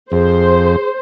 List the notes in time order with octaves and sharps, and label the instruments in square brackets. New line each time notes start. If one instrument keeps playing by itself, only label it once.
[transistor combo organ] F2 [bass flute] G#4 [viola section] C5